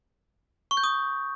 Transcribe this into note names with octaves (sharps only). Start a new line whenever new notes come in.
C#6
G6
D#6